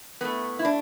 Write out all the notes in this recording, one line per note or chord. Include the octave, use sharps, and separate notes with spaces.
A2 A3 B3
E4
D4